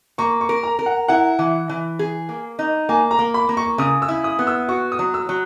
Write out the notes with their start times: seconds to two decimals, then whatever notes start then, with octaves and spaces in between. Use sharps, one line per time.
0.18 A#3 C#6
0.41 C#6
0.49 A#4
0.63 A#5
0.79 A#4
0.86 F#5
1.08 E4 F#5
1.39 E3
1.69 E3
1.99 G#4
2.29 A#3
2.59 D#4
2.89 A#3 G#5
3.11 A#5
3.19 A#3
3.34 B5
3.49 A#3
3.57 C#6
3.78 C#3 D#6
4.02 E6
4.08 E4
4.24 D#6
4.39 B3
4.47 E6
4.69 F#4 C#6
4.92 D#6
4.99 F#3
5.14 E6
5.29 F#3